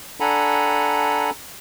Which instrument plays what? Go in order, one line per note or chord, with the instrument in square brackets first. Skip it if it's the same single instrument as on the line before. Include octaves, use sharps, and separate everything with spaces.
[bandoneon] D4 A4 F#5 G#5 A#5 B5